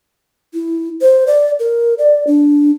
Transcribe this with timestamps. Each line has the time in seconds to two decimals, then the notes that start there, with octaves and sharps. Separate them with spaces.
0.54 E4
1.01 C5
1.27 D5
1.60 A#4
1.98 D5
2.27 D4